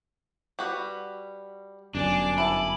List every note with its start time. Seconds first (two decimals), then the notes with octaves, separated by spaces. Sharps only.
0.59 G3 F#4 B4
1.95 G1 F#2 D4 G#5 D6
2.38 E4 A5 B5